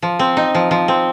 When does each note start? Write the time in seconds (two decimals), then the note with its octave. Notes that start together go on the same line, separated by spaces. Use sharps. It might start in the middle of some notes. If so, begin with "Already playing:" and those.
0.02 F3
0.19 C4
0.37 D#4
0.55 F3
0.71 F3
0.88 C4